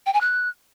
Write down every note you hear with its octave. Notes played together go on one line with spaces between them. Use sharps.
G5
G#5
F#6